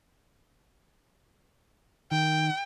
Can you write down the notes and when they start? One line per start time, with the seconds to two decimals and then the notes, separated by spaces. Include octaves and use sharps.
2.11 D#3 G5